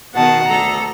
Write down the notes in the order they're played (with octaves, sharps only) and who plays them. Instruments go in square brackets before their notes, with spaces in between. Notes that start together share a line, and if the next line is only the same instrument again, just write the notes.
[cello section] B2 D#3 [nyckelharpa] F#5 A5
[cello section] D2 A4 [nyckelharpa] A#5